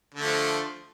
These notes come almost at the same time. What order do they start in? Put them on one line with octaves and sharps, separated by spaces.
D3 A3 F3